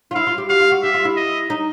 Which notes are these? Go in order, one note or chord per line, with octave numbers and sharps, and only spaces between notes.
F4
E4 F5
F4
G4
F#4 F5
F4
F#4
G4 E5
F4
E4
D#5
D#4